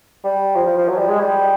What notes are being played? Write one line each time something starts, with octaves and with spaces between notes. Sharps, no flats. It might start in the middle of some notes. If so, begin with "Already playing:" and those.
G3
F3
F3
F3
F#3
G3
G#3
G3